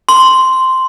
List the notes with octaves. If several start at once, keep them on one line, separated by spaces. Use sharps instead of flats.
C6